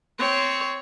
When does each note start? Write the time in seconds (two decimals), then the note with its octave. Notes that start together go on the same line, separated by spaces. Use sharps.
0.19 C4 C#5